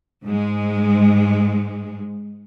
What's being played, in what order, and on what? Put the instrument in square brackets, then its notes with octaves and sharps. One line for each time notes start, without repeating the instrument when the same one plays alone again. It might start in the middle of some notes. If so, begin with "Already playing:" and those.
[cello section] G#2 G#3